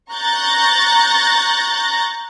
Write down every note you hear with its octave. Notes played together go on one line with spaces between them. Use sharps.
A#5 C#6 F#6 G6 A6 A#6